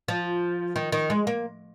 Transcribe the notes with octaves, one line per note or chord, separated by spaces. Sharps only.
F3
D#3
D#3
G#3
A#3